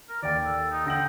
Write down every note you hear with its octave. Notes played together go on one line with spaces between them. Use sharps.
A#4
D#2 D5 G5
A4
D#4
D3 G5 A#6 F#7